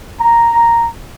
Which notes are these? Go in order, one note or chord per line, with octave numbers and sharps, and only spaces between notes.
A#5